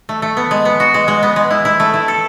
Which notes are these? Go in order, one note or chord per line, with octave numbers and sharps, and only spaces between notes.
A3
A3
B3
G#3
B3
F#4
G#3
G#3
B3
G#3
E4
E4
A3
E4
A4